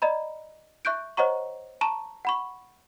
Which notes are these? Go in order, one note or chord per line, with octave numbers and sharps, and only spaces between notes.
D5 D#5 A#5 B5
E5 C#6 F#6 G6 D7
C5 C#5 D#5 F#5 A#5 C#6
A5 A#5 C#6 E7
F#5 B5 C#6